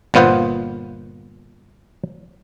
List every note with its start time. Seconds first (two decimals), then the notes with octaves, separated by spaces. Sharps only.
0.14 G1 A#2 B3 F4 C5 F#5